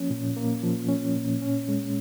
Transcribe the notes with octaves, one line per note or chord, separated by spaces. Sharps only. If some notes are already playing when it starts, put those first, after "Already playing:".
Already playing: F3 A#3 C#4
A#2
A#3
F3
C#4
A#2
C#4
G#3